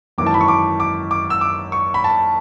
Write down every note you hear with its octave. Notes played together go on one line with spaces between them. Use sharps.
G#1 F#2 E3 D6
A5
B5
C#6
D6
D6
D6
E6
D6
C#6
B5
A5